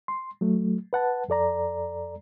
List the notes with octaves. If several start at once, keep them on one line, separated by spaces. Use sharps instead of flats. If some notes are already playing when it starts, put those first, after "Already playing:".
C6
F#3 A3
B4 F#5 A5
F2 A4 D5 A#5